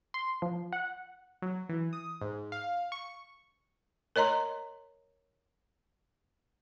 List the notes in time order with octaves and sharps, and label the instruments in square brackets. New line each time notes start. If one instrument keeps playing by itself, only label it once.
[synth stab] C6
F3
F#5
F#3
E3
D#6
G#2
F5
C#6
[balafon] A#4 C#5 D#5 A#5 C6